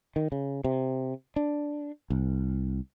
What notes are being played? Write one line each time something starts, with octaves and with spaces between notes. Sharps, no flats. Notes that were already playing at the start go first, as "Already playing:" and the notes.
D#3
C#3
C3
D4
C2